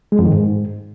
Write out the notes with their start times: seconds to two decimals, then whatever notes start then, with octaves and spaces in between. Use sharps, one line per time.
0.12 G#3
0.19 F2
0.25 D#3
0.32 G#2